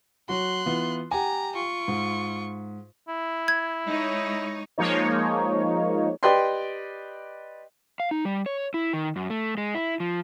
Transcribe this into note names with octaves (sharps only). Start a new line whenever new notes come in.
F#3 F#4 C6 F#6
E3 B3 F4
G4 F#5 G#5 A#5
F4 C#6
G#2
E4
G#6
G#3 D#4 C#5
F3 G#3 A#3 D#4 C#5
G4 B4 D5 D#5 G5 C6
F5
D#4
G3
C#5
E4
D#3
F#2
A3
G#3
E4
F3